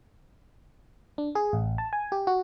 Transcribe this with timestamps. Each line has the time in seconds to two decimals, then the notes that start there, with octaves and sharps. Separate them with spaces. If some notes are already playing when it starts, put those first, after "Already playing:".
1.18 D4
1.35 G#4
1.53 A1
1.78 A5
1.93 G#5
2.12 G4
2.27 F#4